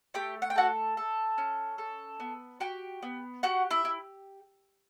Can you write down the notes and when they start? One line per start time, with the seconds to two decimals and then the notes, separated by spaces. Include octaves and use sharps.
0.14 A3 G4 G5
0.42 F#5
0.50 G5
0.56 F#4 A4 F#5
0.97 A4
1.38 C#4
1.78 A4
2.20 B3
2.60 F#4 G4 G5
3.03 B3
3.43 F#4 G4 F#5
3.71 E4 E5
3.85 E4